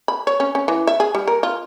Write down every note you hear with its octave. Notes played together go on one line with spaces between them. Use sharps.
B5
C#5
C#4
C#4
E3
E5
G#4
G3
A#4
F4